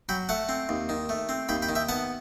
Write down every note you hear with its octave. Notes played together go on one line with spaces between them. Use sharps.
F#3 G5 B5
A3 F#5 A5
C4
D#2
D#3
A3
C4
D#2 G5 B5
G5 B5
D#3
E5 G5
B3 F#5 A5